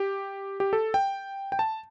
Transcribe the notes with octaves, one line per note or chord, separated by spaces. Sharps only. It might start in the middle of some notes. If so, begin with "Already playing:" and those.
Already playing: G4
G4
A4
G5
G5
A5